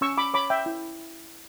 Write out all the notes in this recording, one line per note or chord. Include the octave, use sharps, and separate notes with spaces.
C#4 C#6 E6
B5 D6
C#5 B5 D6
E5 G5
E4